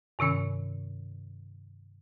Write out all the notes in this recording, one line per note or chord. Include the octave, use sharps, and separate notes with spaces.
G2 C3 D#3 C#4